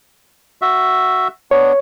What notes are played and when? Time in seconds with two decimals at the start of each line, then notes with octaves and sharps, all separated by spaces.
0.62 F#4 E5
1.51 B3 D4 C#5